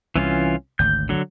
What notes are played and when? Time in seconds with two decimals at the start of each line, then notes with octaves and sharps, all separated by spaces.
0.16 C2 E3 C#4 F4
0.79 G#1 D2 G6
1.09 D3 F#3